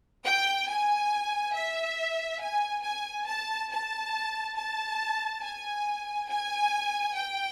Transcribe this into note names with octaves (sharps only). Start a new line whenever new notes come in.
G5
G#5
E5
G#5
G#5
A5
A5
A5
G#5
G#5
G5